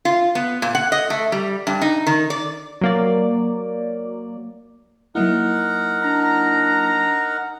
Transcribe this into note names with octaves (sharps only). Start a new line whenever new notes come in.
F4
B3
A#2
F#5
D#5
A3
G3
G2
D#4
D#3
D5
F#3 A#3 D5
F#3 A#3 D#4 E4 A#4 F#5
D4 A#5